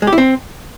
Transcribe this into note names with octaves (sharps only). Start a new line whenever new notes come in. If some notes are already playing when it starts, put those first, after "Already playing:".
G#3
G4
E4
C4